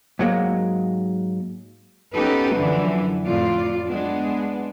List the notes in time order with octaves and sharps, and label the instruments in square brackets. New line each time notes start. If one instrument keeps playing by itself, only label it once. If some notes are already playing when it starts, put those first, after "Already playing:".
[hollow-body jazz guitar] G#2 F#3 G#3 A#3
[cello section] B3 C#4 D#4 G4 A4 B4
F#2 D3 E3 F3 D4
F2 A2 F4 D5
G#3 B3 D4